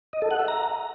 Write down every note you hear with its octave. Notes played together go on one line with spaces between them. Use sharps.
D#5
A4
F#5
E5
A#5